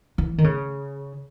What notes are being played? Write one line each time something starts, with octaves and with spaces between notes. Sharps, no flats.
E3
D#3
C#3